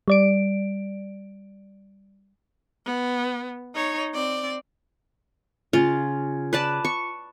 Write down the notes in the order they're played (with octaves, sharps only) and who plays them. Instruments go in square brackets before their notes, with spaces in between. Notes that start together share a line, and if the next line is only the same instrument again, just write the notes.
[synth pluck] G3 D5 D7
[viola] B3
D#4 C#5
C4 D5
[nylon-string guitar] C#3 [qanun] F4
[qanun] B4 D5 A5
C#6